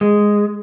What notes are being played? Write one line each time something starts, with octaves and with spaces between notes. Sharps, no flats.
G#3